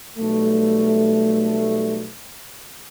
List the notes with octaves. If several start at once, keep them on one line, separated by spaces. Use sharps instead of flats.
B1 G3 A3